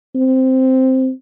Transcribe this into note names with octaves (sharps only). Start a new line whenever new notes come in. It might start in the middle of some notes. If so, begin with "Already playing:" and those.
C4